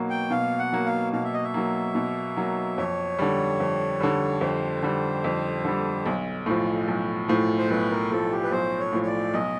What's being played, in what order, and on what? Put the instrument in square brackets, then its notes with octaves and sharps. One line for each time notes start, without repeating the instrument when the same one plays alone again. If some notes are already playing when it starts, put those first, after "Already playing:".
Already playing: [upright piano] B2 F#3 A#3
[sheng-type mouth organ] G5
[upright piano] B2 [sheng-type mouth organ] F5
[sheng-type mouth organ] F#5
[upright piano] F#3 A#3
[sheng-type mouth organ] F5
[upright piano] B2 [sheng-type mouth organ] F5
[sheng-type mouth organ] E5
D#5
E5
[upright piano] F#3 A#3
B2
F#3 A#3
[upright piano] F2 [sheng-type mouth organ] C#5
[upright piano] D3 G3
F2
D3 G3
[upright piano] F2 [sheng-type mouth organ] C5
[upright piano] D3 G3
F2
D3 G3
B1
A2 F3
B1
A2 F3
[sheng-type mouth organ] C5
[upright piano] B1 [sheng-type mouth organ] B4
[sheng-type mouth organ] A#4
[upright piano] A2 F3 [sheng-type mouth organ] A4
[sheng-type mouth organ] G4
B4
[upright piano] B1 [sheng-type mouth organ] C5
[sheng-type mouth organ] C#5
[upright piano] A2 F3
[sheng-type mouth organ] C#5
D5
[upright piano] B1 [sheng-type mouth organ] D#5